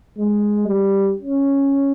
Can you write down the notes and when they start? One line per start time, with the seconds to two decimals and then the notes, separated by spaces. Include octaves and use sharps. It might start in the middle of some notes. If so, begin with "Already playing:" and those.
0.19 G#3
0.68 G3
1.19 C#4